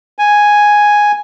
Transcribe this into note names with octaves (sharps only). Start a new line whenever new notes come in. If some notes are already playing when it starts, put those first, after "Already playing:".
G#5